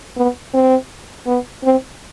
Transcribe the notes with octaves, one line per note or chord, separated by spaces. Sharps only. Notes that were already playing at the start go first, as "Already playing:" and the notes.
B3
C4
B3
C4